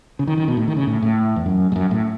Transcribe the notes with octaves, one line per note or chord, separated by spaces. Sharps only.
C#3
D#3
D#3
B2
A2
D#3
C#3
A2
A2
E2
F#2
G#2
F#2
A2